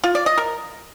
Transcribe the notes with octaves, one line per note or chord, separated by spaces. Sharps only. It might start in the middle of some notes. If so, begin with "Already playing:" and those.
F4
D5
D#5
A#4